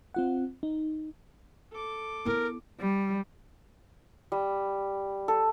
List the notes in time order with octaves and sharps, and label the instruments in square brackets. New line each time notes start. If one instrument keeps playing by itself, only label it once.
[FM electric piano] C4 F4 F#5
D#4
[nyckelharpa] A4 D6
[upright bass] B3 E4 [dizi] A#4
[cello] G3
[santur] G3
A4